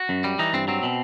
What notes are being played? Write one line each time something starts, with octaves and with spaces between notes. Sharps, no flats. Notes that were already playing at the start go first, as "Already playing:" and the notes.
Already playing: F#4
F#2
G3
E3 D#4
G2 C4
F#3 C4
B2